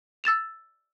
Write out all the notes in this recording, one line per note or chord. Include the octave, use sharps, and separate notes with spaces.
E6 A6 E7 F7